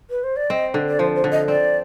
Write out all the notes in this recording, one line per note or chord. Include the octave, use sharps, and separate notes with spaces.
B4
C5
D5
C4 D#5
D3
D5
F3 C5
C5
D3
D#5
C4 D5